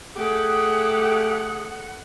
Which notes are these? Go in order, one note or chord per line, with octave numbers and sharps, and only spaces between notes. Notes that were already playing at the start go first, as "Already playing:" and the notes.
A3 G4 G#4 F#5